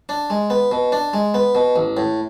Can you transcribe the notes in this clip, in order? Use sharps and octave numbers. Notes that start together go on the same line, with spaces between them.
D4
G#3
B3
B2
D4
G#3
B3
B2
A1
A2